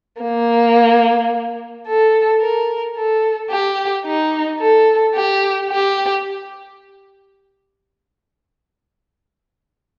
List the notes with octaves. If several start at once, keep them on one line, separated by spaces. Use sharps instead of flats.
A#3
A4
A#4
A4
G4
D#4
A4
G4
G4